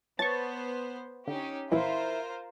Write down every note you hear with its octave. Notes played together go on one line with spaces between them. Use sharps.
B3 C5 C#5 A5 C#6 A6
D3 C#4 D#4 G4
A#1 E3 E4 F4 A#4 C5 E5